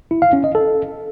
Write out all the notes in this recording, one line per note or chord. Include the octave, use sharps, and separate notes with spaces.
E4
F5
C#4
D#5
A4